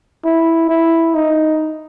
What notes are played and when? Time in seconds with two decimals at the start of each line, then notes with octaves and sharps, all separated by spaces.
0.25 E4
0.69 E4
1.15 D#4